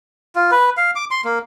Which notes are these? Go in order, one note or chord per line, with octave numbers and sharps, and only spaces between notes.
F4
B4
F5
D6
C6
A#3